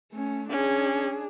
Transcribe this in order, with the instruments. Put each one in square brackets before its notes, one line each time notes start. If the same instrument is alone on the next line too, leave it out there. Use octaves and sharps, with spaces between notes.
[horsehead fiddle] A3 C#4
[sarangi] C#4 [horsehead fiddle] D4 G#4